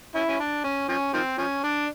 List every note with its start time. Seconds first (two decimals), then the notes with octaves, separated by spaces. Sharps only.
0.15 C#4 E4
0.28 C#4
0.40 D4
0.64 C#4
0.89 F3 C#4
1.14 D#3 F3 C4
1.38 F3 C#4
1.64 D4